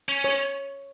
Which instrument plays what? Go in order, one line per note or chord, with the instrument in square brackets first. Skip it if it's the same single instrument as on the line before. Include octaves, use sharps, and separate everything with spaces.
[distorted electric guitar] C#4
[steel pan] C#5